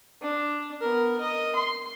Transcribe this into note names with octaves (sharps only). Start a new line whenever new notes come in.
D4
B3 A#4
A#4 D#5
C6